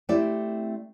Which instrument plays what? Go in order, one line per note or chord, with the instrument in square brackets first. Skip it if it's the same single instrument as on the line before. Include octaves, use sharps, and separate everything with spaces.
[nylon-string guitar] A3 C4 E4 G4 D5